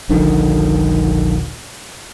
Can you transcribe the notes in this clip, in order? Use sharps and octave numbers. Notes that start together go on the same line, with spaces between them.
D#1 A#1 D3 D#3